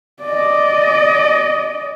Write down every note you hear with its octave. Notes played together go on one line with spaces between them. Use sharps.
D5 D#5